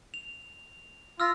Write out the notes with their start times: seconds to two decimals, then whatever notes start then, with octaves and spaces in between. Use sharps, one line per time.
0.14 F7
1.20 F4 E6 F6 A#6